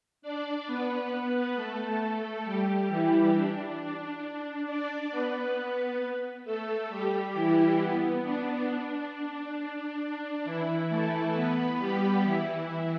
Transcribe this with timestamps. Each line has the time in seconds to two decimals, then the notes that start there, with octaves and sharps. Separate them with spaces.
0.22 D4 D5
0.66 B3 B4
1.56 A3 A4
2.45 G3 G4
2.89 E3 E4
3.33 D4
4.23 D4
4.67 D4 D5
5.11 B3 B4
5.55 B3 B4
6.45 A3 A4
6.89 G3 G4
7.34 E3 E4
7.78 B3
8.23 D4
8.67 D4
9.12 D4
9.56 D4
10.00 D4
10.45 E3 E4
10.89 A3 A4
11.34 B3 B4
11.78 G3 G4
12.23 E3 E4
12.67 E3 E4